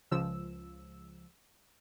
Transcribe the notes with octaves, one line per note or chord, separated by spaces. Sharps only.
C#2 F3 E6